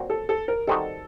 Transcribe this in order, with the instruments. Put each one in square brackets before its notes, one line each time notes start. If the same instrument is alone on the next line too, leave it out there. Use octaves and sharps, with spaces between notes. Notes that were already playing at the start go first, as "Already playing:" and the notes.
Already playing: [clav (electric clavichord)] A#2 F#3 C4 F#4
[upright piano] A4
A4
A#4
[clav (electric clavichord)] D#3 G3 C4 D#4 F#4 [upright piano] A4